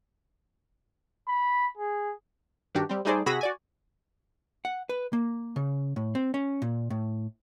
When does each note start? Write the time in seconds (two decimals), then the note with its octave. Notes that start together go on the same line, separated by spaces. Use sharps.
1.27 B5
1.77 G#4
2.75 G2 D#3 D4 F#4 G4
2.89 G3 C4
3.05 G3 A3 D#4 G#4 C5 D5
3.26 C3 F#4 G#4 B5 E6 A#6
3.41 F#4 D5 G#5
4.65 F#5
4.89 B4
5.13 A#3
5.56 C#3
5.96 A2
6.15 C4
6.34 C#4
6.62 A#2
6.90 A2